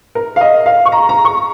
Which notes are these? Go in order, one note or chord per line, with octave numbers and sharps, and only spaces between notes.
A#4
F5
D#5
F5
C#6
A#5
A#5
C#6